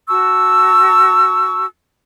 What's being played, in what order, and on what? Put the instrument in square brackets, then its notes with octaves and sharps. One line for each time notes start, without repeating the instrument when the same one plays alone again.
[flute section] F#4 A5 C#6 E6